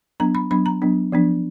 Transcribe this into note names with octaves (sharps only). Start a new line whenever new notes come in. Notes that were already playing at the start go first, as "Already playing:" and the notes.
F#3 B3 D4 A#5
B5
F#3 B3 D4 B5
A#5
F#3 B3 D4
F3 B3 D4